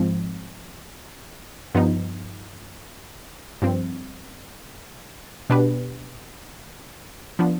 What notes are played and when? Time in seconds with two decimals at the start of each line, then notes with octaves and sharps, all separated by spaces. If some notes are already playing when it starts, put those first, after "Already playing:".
Already playing: G#2 F3 G#3 C4
1.75 G2 F3 B3 D#4
3.62 G2 F3 C4
5.50 B2 B3 D4 G4 B4
7.39 F3 B3 D4